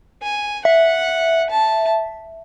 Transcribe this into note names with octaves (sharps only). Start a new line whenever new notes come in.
G#5
E5 F#5
A5